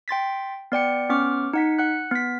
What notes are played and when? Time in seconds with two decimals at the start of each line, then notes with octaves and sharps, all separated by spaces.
0.08 G5 C6 A6 B6
0.72 B3 D5 G5 C#7
1.10 B3 C#4 C#6 D6 F6
1.53 D#4 F#5 B6
1.79 F#5 F#6
2.11 B3 B6